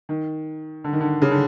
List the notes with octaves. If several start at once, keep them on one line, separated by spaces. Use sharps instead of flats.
D#3
D3
D#3
D3
C#3
D3